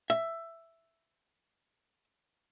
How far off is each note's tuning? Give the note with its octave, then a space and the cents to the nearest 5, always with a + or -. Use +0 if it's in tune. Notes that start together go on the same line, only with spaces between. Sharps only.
E5 +10